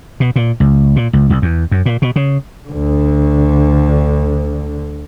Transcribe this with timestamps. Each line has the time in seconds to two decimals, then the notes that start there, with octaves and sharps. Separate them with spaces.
0.20 B2
0.36 A#2
0.60 C#2
0.96 A#2
1.13 C#2
1.30 C2
1.42 E2
1.71 F#2
1.86 A#2
2.02 B2
2.16 C#3
2.69 D2 D3